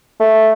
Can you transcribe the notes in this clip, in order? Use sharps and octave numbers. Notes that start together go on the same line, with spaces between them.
A3